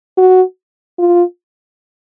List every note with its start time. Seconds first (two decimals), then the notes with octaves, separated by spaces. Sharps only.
0.18 F#4
0.99 F4